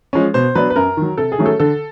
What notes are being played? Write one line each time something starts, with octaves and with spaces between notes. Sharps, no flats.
F3 G#3 C#4
B2 C5
F#3 B3 D4 B4
B4
F#2 A#4
D#3 F#3
C3 A4
G#4
D#3 F#3 A3 C#4
A4
D3 A4